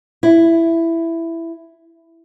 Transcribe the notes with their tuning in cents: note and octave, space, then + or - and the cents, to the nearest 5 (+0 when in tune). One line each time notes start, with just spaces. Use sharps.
E4 +10